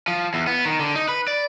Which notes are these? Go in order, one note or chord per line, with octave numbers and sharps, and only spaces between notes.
F3
E2
B3
D#3
D3
D#4
B4
D5